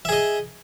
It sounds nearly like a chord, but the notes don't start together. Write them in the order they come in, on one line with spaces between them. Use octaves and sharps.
E5 G#4 D#5